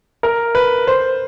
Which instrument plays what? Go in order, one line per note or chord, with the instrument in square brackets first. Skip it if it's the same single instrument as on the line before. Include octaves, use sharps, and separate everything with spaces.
[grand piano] A#4
B4
C5